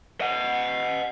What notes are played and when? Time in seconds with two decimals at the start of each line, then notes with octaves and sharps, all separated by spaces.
0.21 D#5 F#5